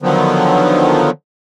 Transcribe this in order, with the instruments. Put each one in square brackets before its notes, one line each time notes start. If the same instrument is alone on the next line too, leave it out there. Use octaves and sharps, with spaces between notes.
[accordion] D3 D#3 F3 F#3 B3